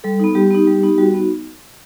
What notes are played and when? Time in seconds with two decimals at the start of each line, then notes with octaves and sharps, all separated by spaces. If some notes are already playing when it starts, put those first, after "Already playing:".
0.04 G3 A4
0.20 B3 D#4
0.35 G3 G4
0.51 B3 D#4
0.67 G3
0.83 B3 D#4
0.89 G4
0.98 G3 F#4
1.14 B3 D#4